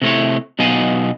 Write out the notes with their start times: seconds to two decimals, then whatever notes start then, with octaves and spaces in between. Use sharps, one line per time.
0.02 C3 A3 E4 C#5
0.59 B2 F#3 B3 D#4 F5 G#5